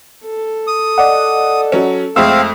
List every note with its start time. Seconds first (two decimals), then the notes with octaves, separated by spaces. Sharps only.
0.25 A4
0.67 D#6
0.98 D5 D#5 F#5
1.72 F#3 C#4
2.16 F2 G#3 A3 C4 F5 E6